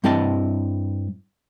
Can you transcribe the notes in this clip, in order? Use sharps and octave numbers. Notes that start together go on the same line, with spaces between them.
G2 G3 C4 E4 D#5 A5